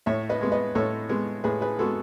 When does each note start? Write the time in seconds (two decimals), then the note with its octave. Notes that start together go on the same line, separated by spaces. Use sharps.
0.06 A2 C#5 E5
0.29 B4 D#5
0.41 G#3 B3
0.52 B4 D#5
0.75 A2 A4 C#5
1.09 G#3 B3
1.44 A2 G#4 B4
1.61 G#4 B4
1.79 G#3 B3 F#4 A4